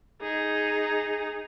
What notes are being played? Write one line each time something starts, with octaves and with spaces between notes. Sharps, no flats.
D#4 G#4